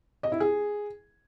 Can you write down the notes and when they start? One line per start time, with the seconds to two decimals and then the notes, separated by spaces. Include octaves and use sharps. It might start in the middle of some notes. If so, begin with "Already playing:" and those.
0.23 D#5
0.32 E4
0.40 G#4